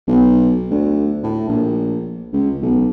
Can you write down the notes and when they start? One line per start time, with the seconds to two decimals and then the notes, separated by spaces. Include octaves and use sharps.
0.07 B1
0.71 D2
1.23 A2
1.48 A#1
2.33 C#2
2.61 B1